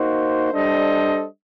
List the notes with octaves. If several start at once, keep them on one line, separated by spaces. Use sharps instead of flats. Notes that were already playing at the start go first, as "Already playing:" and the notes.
Already playing: A#3 D#4 F#4 C5
G3 D4 A4 C5 D#5